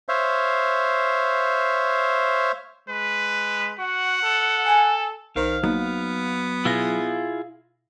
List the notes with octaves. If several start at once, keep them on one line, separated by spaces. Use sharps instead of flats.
C5 C#5 E5 F5
G#3 B4
F#4 F#5
A4
G#5
B1 D#3 C5 F5
F#3 A#3 B3 D#4
B2 E4 F4 G#4 A#6